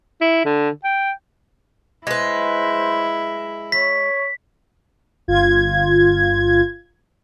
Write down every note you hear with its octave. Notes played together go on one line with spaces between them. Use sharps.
E4
D3
G5
G#3 E4 B4 C5
C#5 B6
G1 F4 G#6